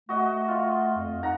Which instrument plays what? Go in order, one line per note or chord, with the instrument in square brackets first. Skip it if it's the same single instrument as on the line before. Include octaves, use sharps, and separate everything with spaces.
[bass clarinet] A3 [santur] F#4 D#5
[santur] F4
[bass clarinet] F2
[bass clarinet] D#4 [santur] F#5 A#5